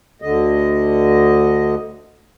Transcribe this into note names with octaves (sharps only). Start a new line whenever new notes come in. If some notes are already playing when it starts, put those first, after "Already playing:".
D2 D3 D#5